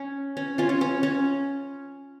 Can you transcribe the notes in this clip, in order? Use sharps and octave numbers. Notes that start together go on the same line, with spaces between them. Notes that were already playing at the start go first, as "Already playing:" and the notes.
Already playing: C#4
C#4
C#4 F4
C#4
C#4
C#4